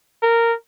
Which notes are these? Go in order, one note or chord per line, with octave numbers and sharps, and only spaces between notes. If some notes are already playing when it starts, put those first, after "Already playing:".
A#4